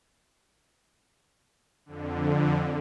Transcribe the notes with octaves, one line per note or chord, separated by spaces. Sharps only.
F2 D3